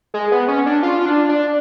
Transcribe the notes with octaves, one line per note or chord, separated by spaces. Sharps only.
G#3
B3
C#4
D4
F4
F4
D4
D4